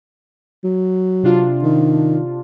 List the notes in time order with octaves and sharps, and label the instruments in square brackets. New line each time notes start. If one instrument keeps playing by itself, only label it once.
[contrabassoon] F#3
[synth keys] C3 D4 F4
[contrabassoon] D#3